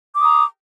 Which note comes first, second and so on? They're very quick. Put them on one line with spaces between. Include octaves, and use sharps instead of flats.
D6 D#6 A#5